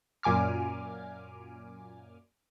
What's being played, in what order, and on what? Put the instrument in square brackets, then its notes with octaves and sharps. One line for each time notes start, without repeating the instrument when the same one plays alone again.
[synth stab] F#2 A#2 G#5 D6 F6